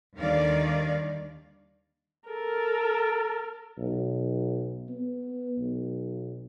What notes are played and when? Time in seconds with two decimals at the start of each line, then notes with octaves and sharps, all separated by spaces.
0.17 D#2 D3 D#3 G3 D5 F5
2.28 A4 A#4
3.78 B1
4.89 B3
5.59 B1